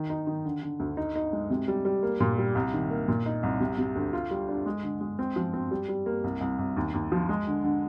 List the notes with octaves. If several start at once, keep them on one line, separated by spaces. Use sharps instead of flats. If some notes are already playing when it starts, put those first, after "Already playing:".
Already playing: D#3
D#4
D#3
D3
D3
D2
D#4
D#4
G#3
C3
G3
G3
A#3
A#2
G3
C2
D#3
A#3
A#2
D#4
C2
C3
C3
D2
F4
G3
D4
G#3
D3
G#3
C4
F3
C4
G3
G3
A#3
C2
C2
C2
D#2
D#2
F3
G#3
D3
D3